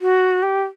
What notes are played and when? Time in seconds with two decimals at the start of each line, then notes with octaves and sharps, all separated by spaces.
0.01 F#4
0.43 G4